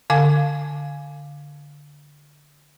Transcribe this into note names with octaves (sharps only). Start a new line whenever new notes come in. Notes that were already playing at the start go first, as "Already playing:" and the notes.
D3 F5 G#5 D6